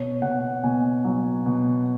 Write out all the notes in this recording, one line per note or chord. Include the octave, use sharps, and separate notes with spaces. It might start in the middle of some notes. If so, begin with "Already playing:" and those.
Already playing: B2 C#5
B2 F#5
B2 G#5
F#3
B2